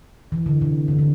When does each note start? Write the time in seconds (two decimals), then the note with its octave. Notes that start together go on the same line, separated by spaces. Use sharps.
0.32 E3
0.46 D3
0.61 C3
0.88 D3
0.98 D3